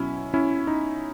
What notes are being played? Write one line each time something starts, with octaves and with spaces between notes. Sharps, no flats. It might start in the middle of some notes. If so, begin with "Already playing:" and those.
Already playing: B2 F#3 C#4 E4
C#4 E4
D#4